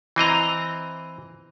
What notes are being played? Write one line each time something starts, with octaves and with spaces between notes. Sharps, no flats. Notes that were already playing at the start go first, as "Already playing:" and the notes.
E3 C4 D#5 A#5